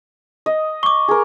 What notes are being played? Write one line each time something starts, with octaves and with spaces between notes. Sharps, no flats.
D#5
C#6 D6
G#4 A#4